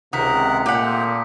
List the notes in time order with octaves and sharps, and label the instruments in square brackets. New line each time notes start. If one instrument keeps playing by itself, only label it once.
[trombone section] C#2 C3 [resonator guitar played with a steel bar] D#3 [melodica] A#4 F#5 [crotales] D#6 B6
[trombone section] A#2 [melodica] A3 A#3 G5 [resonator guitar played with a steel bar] G4 F#5